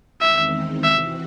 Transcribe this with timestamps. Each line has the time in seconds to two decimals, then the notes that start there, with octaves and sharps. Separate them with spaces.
0.21 E2 D#3 G#3 C4 D#4 E5
0.84 C3 E3 C4 F#4 E5